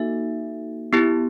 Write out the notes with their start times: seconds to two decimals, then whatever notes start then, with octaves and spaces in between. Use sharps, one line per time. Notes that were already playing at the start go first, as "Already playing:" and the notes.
Already playing: A#3 D#4 F#4 A4 E5
0.93 B3 E4 G4